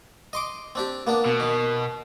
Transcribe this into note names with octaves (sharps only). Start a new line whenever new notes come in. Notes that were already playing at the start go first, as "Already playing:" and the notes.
D#5 C6 D6
C4 D4 G4
A#3 B3 D4
B2
D#3